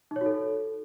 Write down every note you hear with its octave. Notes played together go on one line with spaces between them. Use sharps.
D#4 F#4 A4 C#5